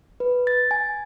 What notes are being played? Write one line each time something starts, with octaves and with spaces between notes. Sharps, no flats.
B4
A6
G#5